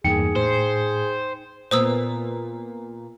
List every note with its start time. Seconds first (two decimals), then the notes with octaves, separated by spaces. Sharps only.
0.04 E2 G2 A#3 D#4 G#4 G5 C#7
0.36 A2 C5
1.71 A#2 B3 C5 D#6 E6